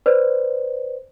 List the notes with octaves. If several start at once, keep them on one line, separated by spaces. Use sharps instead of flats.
B4 C5 D5